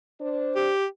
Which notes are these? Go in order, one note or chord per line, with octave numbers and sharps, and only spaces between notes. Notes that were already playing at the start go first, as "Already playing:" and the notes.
D4 C5
G4